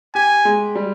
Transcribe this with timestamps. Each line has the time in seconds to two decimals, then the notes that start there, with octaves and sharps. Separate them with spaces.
0.15 G4 G#5
0.45 G#3
0.75 G3